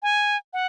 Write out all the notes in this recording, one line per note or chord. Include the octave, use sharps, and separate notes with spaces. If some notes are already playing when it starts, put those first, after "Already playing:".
G#5
F#5